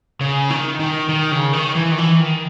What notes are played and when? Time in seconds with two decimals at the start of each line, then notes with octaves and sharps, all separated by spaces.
0.21 C#3
0.50 D#3
0.80 D#3
1.09 D#3
1.32 C#3
1.53 D#3
1.75 E3
1.92 D#3
1.98 E3
2.20 D#3